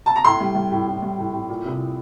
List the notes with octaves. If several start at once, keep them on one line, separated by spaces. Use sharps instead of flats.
A5
A#5
A2 C6
G3
G3
A2
A2
G3
A2
A2
A#2
C2